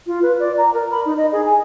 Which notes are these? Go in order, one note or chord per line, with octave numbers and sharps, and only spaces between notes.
F4
B4
D5
A#5
A#4
B5
D#4
D#5
G#4
G#5